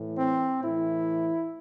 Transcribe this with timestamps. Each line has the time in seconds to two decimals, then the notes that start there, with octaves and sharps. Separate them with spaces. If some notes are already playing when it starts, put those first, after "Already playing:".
Already playing: A2 E3
0.18 C4
0.62 A2 E3 E4